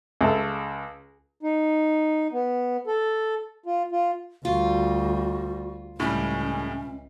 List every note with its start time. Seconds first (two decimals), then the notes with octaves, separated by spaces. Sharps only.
0.21 C#2 A4
1.43 D#4
2.32 B3
2.87 A4
3.66 F4
3.92 F4
4.45 D2 G3 F4 F#4
6.00 C#2 A2 G3 C#4